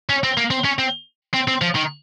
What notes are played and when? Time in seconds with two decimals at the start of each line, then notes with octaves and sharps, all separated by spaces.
0.09 C#4
0.24 C4
0.37 A#3
0.51 C4
0.65 C#4
0.79 C4
1.34 C4
1.48 C4
1.62 F3
1.76 D#3